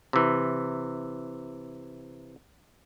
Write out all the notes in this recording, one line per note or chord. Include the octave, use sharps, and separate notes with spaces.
C3 E3